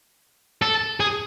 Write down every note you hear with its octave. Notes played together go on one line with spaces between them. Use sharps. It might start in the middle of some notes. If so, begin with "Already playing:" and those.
A4
G#4